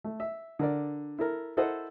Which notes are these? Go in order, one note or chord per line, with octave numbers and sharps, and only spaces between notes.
A3
E5
D3 A#4 D5
E4 A4 A#4
E4 A4 A#4 C5 D#5 F#5